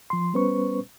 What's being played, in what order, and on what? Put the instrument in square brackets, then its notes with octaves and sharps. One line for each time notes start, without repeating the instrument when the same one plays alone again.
[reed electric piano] F3 C6
G3 B3 C#4 B4 C5 C#6